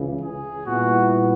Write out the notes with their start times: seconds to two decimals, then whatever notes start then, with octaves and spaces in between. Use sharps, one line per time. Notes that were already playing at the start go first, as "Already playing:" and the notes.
Already playing: C#2 C#3 E3
0.21 G#4
0.66 A#2 G3 B3 E4 F#4